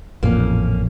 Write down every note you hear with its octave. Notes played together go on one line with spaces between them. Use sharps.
A1 F2 A#2 A#3 C#4